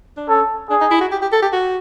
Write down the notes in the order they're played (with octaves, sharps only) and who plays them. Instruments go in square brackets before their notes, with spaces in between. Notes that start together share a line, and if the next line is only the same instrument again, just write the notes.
[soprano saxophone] D4
[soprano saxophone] C#4 [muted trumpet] A4
[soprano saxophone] D4 [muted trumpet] G#4
[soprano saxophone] D#4
E4
F#4
G4
G4
A4
G4
F#4